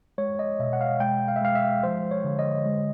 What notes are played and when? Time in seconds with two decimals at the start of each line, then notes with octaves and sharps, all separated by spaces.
0.18 G#3 C#5
0.39 D#5
0.59 B2 E5
0.73 F#5
0.81 F5
1.00 G#3 G5
1.28 F5
1.36 E5
1.41 G#3 F5
1.55 E5
1.83 F3 C5
2.11 C#5
2.24 D3
2.39 D#5
2.66 G#3